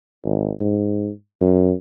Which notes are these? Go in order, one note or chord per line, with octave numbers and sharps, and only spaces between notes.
G#1
G#2
F#2